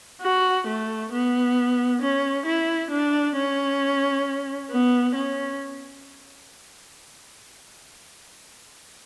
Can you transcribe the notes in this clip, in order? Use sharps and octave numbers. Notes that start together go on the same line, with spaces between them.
F#4
A3
B3
C#4
E4
D4
C#4
B3
C#4